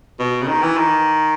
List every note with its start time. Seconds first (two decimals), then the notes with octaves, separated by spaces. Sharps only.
0.20 B2
0.42 C#3
0.48 D#3
0.63 E3
0.77 D#3